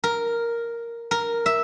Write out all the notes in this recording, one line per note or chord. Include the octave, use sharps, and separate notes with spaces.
A#4
A#4
E5